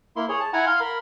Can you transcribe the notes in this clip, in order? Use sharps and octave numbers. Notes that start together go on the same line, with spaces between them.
A#3 E4 C6
G#4 C#5
A5
E4 F#5 G#5 A#5
F5 C6
A#4 B5